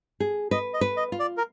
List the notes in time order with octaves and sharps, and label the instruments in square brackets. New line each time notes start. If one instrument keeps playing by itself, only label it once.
[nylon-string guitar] G#4
[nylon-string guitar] B4 [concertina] D#5
[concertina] D#5
[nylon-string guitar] B4
[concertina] D#5
[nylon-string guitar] F4
[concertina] D5
A#4